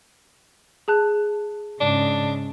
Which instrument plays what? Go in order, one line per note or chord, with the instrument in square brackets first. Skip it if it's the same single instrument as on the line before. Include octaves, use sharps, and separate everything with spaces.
[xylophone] G#4 A5 F#6
[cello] G#2 C#3 [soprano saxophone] D4